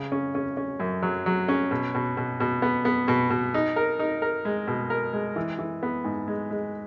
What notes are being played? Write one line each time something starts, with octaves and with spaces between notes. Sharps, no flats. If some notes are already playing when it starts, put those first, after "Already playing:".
Already playing: C#3
C#4
C#4
C#4
F#2
F#3
F#3
C#4
B2
B2
B2
B2
B3
B3
B2
B2
D#4
A#4
D#4
A#4
G#3
B2
A#4
G#3
E3
E3
B3
G#2
G#3
G#3